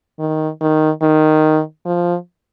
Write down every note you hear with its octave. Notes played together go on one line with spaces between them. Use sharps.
D#3
D#3
D#3
F3